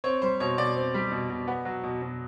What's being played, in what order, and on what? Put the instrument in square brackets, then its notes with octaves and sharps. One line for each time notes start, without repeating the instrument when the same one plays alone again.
[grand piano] C4 C#5
G3 C5
B2 C#5
B2 D5
C4
G3
B2
B2
B3
F#3
B2
B2